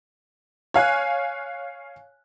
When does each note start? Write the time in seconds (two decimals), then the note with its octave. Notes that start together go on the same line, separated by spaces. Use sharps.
0.74 C#5 F5 G#5 F#6